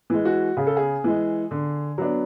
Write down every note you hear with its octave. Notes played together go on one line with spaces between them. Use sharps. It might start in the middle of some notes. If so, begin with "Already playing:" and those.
E3 G#3
F#4
C#3 G#4
A4
G#4
E3 G#3
D3
F#3 B3 D4